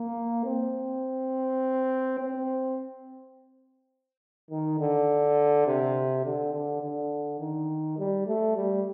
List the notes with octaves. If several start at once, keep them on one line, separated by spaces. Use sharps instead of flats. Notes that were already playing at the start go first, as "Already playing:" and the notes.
Already playing: A#3
C4
C4
D#3
D3
C3
D3
D3
D3
D#3
G3
A3
G3